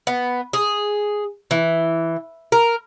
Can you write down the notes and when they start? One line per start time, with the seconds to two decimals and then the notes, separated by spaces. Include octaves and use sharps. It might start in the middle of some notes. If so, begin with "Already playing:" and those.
0.07 B3
0.53 G#4
1.51 E3
2.52 A#4